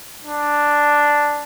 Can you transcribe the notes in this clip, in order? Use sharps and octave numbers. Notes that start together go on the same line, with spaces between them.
D4